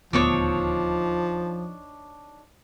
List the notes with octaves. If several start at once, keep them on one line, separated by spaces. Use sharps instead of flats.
D#1 D2 F3 B3 D4 D#4 C#5